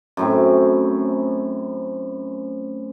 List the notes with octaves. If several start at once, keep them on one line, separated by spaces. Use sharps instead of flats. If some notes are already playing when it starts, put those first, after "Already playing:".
F#2 A2 C4